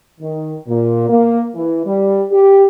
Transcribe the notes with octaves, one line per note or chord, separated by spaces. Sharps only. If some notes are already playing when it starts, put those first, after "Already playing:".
D#3
A#2
A#3
E3
G3
G4